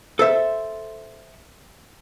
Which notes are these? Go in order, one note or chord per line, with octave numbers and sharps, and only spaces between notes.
A4 C5 E5